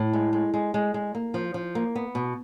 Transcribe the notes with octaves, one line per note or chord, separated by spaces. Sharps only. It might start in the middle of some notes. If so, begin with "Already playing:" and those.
Already playing: A2
G#3
G#3
G#3
G#3
G#3
A#3
F3
F3
A#3
B3
B2